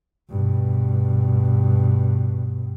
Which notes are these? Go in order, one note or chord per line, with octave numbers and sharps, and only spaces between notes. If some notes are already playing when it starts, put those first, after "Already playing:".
G2 B2